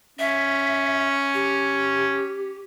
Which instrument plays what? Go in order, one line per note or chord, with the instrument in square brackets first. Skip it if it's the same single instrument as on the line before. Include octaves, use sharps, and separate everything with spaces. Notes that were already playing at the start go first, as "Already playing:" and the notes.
[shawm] C#4 [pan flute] E5
[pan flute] G4